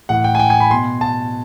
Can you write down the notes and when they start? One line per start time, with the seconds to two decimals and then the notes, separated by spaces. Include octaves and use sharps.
0.09 A2 E3 F#5
0.24 G5
0.35 G#5
0.39 G5
0.50 G#5
0.60 B5
0.70 B2 C6
1.01 A5